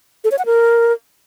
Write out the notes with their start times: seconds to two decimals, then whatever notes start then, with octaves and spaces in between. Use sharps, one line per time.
0.24 A4
0.31 C#5
0.39 F#5
0.46 A#4